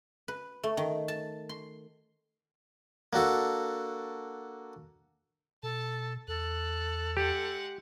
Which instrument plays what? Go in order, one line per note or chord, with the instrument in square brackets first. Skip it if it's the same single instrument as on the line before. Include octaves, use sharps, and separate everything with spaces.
[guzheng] B4
A3
D#3
A5
C6
[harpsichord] A#3 D4 F#4 A4
[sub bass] B2 [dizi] A4 [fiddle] A5
[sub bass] E2 [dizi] A4 [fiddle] F#6
[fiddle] G#3 F#5 [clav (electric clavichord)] G4